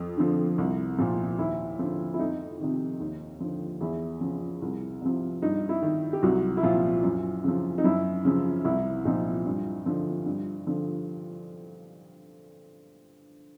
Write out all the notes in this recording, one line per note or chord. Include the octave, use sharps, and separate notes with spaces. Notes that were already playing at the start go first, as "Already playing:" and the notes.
Already playing: F2
D3 F3
C2
A#2 F3
D#2 E4
D3 F3
E4
F2 D#4
C3 D#3
D#2
D3 F3
E2 E4
C#3 F3
C2
C3 F3
G2 D#4
E4
D#3
G4
C2 F#3 F#4
E4
A#2 F3 F4
F#2
C#3 F3
D#4
F#2 E4
C#3 F3
C2 E4
A#2 F3 D#4
G2
D3 F3
G2
D3 F3